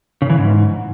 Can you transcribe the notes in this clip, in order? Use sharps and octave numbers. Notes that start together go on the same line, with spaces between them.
C#3
E3
G#2